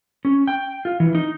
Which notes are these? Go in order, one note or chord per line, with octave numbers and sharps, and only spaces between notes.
C#4
G5
F4
E3
D#4